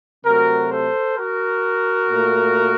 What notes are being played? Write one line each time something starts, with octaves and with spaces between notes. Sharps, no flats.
C3 F#3 A3 F#4 A#4
A4 C5
F#4 A#4
A#2 A3